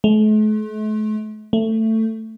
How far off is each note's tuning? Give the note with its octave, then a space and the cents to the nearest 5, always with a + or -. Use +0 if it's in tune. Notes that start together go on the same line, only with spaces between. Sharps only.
A3 -45
A3 +15